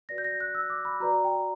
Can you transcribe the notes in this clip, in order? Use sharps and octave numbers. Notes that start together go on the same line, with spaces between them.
F#4 B4 D5 A#6
G6
A#6
F#6
E6
D6
B5
F#4 B4 D5 A#5
G5